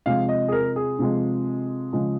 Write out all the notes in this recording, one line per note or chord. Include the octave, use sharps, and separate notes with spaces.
C3 F3 G#3 F5
D#5
G#4
A#4
G#4
C3 F3 G#3
C#3 F3 G#3